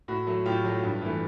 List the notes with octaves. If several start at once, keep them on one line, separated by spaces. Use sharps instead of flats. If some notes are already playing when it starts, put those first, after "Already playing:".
A2 F#4
F#3 A3
A2 F4 G4
F#3 A3
G2
E3 A3